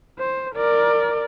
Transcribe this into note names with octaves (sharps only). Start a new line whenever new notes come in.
C5
A#4 D5